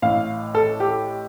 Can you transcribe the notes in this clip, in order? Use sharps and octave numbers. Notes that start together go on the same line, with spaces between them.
A1 A2 F5
A4
G4